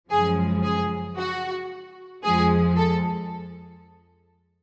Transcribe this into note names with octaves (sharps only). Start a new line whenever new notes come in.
F#2 C#3 F3 G#3 G#4
G#4
F#4
F2 F3 G#3 G#4
A4